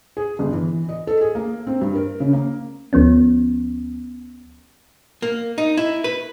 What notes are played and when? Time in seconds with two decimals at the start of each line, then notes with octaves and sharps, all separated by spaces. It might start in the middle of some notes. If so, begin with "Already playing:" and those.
0.17 G#4
0.39 G1
0.53 E3
0.89 D#5
1.07 A4
1.21 G#4
1.35 A#3
1.67 C4
1.81 G2
1.95 A#4
2.20 C#3
2.33 A#3
2.93 D2 F3 B3 C#4
5.22 A#3
5.58 D#4
5.77 E4
6.04 B4